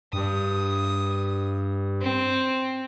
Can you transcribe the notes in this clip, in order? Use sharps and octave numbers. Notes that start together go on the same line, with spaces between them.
G2 D#6
C4